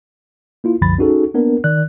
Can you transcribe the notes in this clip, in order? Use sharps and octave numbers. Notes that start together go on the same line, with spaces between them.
A#3 E4 F4
C2 F#2 D3 F3 B5 A6
C#4 D#4 F#4 G#4 A4
A#3 B3 D4 A#4
D#3 D5 F#6